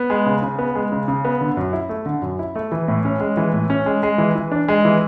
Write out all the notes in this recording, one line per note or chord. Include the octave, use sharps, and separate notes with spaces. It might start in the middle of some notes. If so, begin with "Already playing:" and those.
Already playing: B3
G#3
C#3
C#3
B3
G#3
C#3
C#3
B3
D3
F#2
E4
A3
D3
F#2
E4
A3
E3
A2
C#4
G#3
E3
A2
C#4
G#3
G#3
E3
E3
D4
G#3
E3